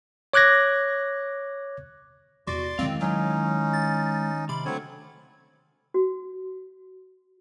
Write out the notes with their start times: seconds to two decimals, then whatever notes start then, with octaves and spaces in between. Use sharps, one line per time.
0.33 C#5 D6 F#6 G#6 A#6
2.47 E2 C3 F#4 D5 C6 D6
2.79 D#3 G#3 C4 E4 D#5 F5
3.01 F#3 C#4 D#4
3.73 A6
4.49 C3 B5 C6 D6
4.65 D3 F#3 A3 C4 C#5
5.94 F#4